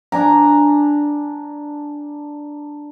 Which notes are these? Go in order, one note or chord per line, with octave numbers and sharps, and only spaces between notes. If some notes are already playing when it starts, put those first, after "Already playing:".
D4 G#5 A#5